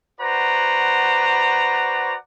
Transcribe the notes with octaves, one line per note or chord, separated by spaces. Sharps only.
F#4 B4 C5 D5 F#5 A#5